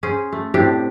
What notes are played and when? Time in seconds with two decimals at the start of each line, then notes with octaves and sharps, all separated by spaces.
0.03 C#4 G#4 C5
0.32 A3
0.54 A2 C3 D4 G4